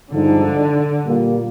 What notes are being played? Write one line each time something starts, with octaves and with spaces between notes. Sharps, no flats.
G2 D3 F3 G#3 D#4
A#2 G3 A#3 F4